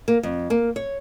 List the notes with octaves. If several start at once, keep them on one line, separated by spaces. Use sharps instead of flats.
A#3
F2
A#3
C#5